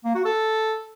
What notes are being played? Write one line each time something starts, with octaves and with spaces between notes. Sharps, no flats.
A#3
F#4
A4